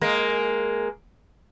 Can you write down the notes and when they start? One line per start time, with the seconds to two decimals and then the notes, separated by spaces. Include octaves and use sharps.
0.01 G#3 A#3